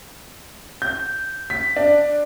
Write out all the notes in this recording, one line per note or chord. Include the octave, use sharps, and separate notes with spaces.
G6
B6
D4